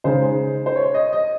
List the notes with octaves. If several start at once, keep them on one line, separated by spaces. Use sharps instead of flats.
C#3 G#3 D#4 C5
C5
C#5
D#5
D#5